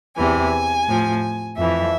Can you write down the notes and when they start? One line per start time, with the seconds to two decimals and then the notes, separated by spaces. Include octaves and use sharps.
0.16 E2 C3 E3 G#5
0.86 A2 F3
1.57 F2 E3 E5